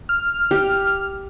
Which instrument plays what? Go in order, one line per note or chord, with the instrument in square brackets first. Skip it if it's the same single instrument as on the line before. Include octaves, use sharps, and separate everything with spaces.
[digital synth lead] F6
[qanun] G4